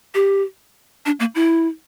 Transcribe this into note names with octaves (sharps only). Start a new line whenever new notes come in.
G4
D4
A#3
E4